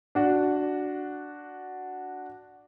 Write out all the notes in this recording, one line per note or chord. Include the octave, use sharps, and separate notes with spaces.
D4 F#4